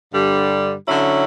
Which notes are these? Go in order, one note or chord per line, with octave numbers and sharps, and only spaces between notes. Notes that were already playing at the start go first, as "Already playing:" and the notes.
G2 D3 G3
D3 F#3 C#4 E4